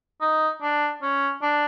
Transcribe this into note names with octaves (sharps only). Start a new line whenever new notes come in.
D#4
D4
C#4
D4